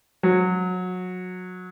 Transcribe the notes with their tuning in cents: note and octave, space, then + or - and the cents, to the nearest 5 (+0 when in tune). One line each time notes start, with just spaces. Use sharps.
F#3 -20